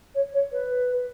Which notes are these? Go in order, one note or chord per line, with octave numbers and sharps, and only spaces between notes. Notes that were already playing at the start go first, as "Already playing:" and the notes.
C#5
C#5
B4